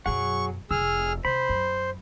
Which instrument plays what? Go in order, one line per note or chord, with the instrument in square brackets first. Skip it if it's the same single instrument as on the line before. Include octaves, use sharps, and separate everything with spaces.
[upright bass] F#2 B2 [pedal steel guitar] F#3 G#4 F#5 [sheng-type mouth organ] C#6
[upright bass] F1 [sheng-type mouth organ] G#4 F6 [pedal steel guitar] E6
[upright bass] C3 [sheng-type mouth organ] C5 [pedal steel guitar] B5
[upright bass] F#2